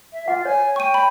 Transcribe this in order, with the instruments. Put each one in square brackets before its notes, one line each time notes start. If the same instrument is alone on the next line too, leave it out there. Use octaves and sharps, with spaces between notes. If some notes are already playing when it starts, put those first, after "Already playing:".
[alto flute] E5
[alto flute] F4 [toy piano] F#5
[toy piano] C#5 [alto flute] G#5
[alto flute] G5 [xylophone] C#6 D#7
[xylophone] B5